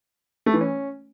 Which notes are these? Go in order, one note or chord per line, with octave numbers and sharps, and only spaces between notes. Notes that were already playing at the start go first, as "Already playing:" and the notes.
A3
E3
C#4